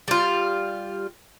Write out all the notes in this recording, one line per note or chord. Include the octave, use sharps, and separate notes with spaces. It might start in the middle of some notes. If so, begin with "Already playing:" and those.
G3 F4